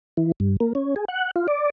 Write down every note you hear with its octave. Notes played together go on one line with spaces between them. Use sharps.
E3
G2
A#3
C#4
G#4
F#5
F4
D5